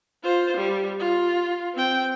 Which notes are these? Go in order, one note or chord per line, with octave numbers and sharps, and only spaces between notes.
F4 C5
G3
F4
C4 G5